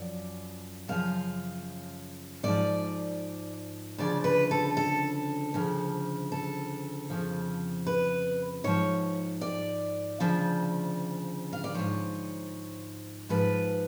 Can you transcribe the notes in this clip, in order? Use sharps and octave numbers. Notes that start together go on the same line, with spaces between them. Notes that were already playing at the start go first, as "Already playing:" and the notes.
Already playing: F#2 F3 D5
F#2 C#3 F3 F5
G#2 F3 D5
D2 C#3 F3 D5
B4
A4
A4
D2 C#3 F3
A4
F2 C#3 F3
B4
G#2 F3 C#5
D5
D2 C#3 F3
F5
D5
G#2 F3 C#5
G#2 F3 B4